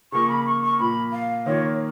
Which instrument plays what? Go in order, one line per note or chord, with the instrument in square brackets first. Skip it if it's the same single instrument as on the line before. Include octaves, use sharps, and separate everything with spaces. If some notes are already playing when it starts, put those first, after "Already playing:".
[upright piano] C#3 F3 A#3 [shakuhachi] C#6
[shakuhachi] B5
C#6
C#6
[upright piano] A#2 F3 A#3 [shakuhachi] B5
[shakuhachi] F5
[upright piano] D#3 A#3 F4 [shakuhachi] C#5